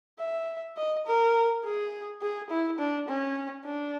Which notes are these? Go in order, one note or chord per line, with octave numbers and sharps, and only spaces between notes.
E5
D#5
A#4
G#4
G#4
E4
D4
C#4
D4